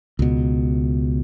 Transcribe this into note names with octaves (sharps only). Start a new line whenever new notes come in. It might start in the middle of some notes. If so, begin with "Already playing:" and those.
C#2 B2